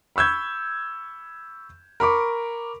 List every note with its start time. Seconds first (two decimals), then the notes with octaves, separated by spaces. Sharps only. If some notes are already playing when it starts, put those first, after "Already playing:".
0.16 B5 C#6 E6 G6 G#6
2.00 A#4 B5 C#6 D6